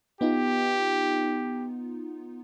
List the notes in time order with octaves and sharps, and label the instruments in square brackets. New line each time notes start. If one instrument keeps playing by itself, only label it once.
[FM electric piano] B3 D#4 F4 [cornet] G4